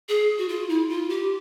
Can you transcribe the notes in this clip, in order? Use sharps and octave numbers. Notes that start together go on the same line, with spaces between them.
G#4
F#4
F4
E4
F4
G4